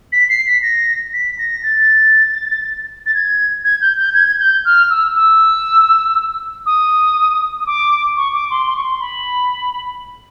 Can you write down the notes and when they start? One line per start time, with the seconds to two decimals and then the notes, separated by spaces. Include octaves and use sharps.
0.13 B6
0.30 C7
0.47 B6
0.62 A#6
1.13 B6
1.39 A#6
1.63 A6
3.06 A6
3.14 G#6
3.64 G#6
3.81 G6
3.98 G6
4.14 G#6
4.39 G6
4.65 F6
4.90 E6
5.15 E6
6.66 D#6
7.59 D#6
7.66 D6
8.17 C#6
8.33 D6
8.50 C6
8.67 C6
8.77 C#6
8.84 C6
9.00 B5